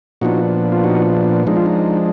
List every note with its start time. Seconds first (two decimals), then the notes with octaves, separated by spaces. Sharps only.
0.21 A#2 F3 B3 D4 D#4 F#4
0.72 F4
0.84 D#4 F#4
1.47 F3 G#3 D4 D#4
1.56 F4
1.66 D#4